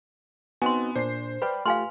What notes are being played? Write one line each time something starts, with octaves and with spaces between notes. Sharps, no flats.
B3 C4 D#4 F#4 G#5 C6
A#2 D4 C5 C7
B4 D5 G5 B5
A3 F4 G4 F5 G#5 C6 F6